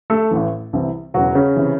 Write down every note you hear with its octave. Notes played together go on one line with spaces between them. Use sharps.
A3 A4
A1 A2 E3
C2 C3 E3
E1 E2 C#3 F#3 F#4
C#3 C#4
C3 E3